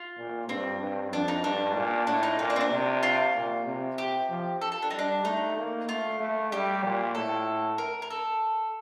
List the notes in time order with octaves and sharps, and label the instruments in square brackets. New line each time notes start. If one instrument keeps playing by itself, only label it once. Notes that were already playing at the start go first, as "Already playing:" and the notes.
Already playing: [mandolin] F4
[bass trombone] A#2
[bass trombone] G2 [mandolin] C4
[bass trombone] G2
[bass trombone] F2 [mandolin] D4
[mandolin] D#4
[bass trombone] G2 [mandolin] D4
[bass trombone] A#2
[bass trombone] A2 [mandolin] D4
[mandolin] D#4
[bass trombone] A#2 [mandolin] D#4
[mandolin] D4
C4
D4
[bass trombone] C3
[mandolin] F4
[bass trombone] A#2
C3
[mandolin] G4
[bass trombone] F3
[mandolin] A4
A4
D4
D#4
[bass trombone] G3
[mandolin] D4
[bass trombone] A3 [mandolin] D#4
[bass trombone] A#3
[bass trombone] A3 [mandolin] F4
[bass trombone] A3
[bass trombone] G3 [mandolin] G4
[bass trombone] A#2
[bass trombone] A2 [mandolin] A4
[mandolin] A#4
A#4
A4